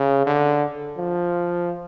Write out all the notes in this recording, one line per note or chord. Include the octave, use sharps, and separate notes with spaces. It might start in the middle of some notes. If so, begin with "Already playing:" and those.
Already playing: C#3
D3
F3